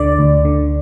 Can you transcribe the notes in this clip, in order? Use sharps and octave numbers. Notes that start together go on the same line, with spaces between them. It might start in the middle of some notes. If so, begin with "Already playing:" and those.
Already playing: D2 D3 D5
D2
D3